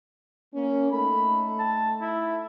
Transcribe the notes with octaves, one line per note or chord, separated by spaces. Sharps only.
A#3 C#4
A3 D#4 A4 B5
A5
E4